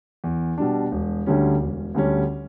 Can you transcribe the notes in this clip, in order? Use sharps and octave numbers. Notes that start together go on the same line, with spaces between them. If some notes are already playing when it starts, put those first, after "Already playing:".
E2
B2 G3 D4
E1
D2 D3 G3 C#4
E1
D2 D3 G3 C#4